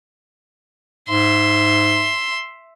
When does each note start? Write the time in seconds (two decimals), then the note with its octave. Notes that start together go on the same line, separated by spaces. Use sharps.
1.09 G#2 E5 C6